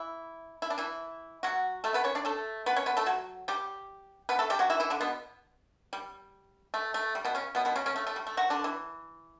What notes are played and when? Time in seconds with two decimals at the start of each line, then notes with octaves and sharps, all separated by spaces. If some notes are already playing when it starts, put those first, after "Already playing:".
Already playing: E3 E4
0.62 E4
0.70 D4
0.78 E3 E4
1.43 F#3 F#4
1.84 A3 A4
1.94 B3 B4
2.04 C#4 C#5
2.15 D4 D5
2.25 A3 A4
2.66 B3 B4
2.76 C#4 C#5
2.86 B3 B4
2.97 A3 A4
3.06 F#3 F#4
3.48 G3 G4
4.29 B3 B4
4.39 A3 A4
4.50 G3 G4
4.59 F#3 F#4
4.70 E3 E4
4.80 E3 E4
4.90 D3 D4
5.01 B2 B3
5.93 G3
6.74 A3
6.94 A3
7.15 G3
7.25 B2 B3
7.35 C#3 C#4
7.55 B2 B3
7.65 B2 B3
7.76 C#3 C#4
7.86 C#3 C#4
7.96 A3
8.07 A3
8.16 G3
8.27 A3
8.37 F#3 F#4
8.50 D3 D4
8.64 E3